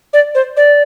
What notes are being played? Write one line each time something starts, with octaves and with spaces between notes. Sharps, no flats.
D5
C5
D5